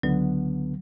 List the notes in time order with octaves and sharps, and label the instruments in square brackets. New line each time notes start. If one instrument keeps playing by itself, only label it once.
[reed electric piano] C#2 D3 B3 [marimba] F#3